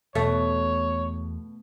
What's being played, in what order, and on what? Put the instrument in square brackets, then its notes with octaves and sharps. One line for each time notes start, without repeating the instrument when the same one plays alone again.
[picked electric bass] E2 [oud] B2 [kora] A3 [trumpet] C#5